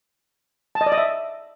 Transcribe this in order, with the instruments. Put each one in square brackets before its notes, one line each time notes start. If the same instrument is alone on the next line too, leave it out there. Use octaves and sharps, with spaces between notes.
[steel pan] A5
D#5
D5
D#5
E5